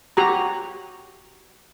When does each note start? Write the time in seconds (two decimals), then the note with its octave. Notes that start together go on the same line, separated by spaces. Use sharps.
0.17 F#4 G4 A#5